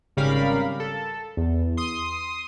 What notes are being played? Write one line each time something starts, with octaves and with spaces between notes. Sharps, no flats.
G#1 C#3 G3 A#4 F5 B5
A4
E2
C6 D#6